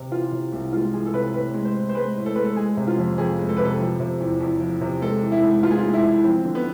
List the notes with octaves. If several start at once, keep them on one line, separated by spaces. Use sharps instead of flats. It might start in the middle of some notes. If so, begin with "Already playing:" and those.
Already playing: C3
E3 F4
C3
C2
G#3 F4
E3 G#4
A4
C3 B4
A2 B4
G#3
C5
A2
C5
G#3 B4
A2
A4
G#3 B4
A4
G#3 G#4
C3
F4
F2
F2 G#4
G#3
A4
C3 B4
A4
F3
C3
E2
E2
F3
C3
G#3 A4
E3
E4
G#2
G#2 F4
G#4
F4
G#3
E4
E3
F3 C4
D3
B3